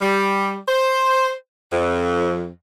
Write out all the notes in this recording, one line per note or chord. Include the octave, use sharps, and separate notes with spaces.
G3
C5
F2